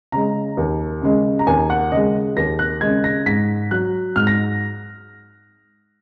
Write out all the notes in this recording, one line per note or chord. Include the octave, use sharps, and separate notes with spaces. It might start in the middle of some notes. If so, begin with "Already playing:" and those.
C#3 G#3 A#5
D#2
C#3 G#3
A#5
D#2 G#5
F#5
C#3 G#3 D#5
D#2 A#6
F#6
C#3 G#3 G#6
A#6
G#2 B6
F#3 F#6
G#2 F6
A#6